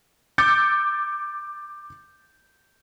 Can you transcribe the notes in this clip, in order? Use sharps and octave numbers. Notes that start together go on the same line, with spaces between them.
D6 E6 G6 A6 C#7